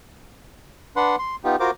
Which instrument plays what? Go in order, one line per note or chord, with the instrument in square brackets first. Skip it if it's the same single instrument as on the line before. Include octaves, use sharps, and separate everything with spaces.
[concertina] D4 B4 F#5 C6
C6
B3 D#4 F4 G4
F4 F#4 A#4 C5 D6